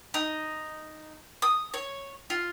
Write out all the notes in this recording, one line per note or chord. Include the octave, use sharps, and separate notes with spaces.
D#4
D#6
C#5
F4